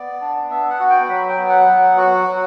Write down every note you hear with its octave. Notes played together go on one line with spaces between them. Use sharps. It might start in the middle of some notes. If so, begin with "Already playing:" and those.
Already playing: B3 D5
D4
B3 E5
F#5
F#4
G5
F#3 B5
G5
B3
F#5
F#3
F#4
F#3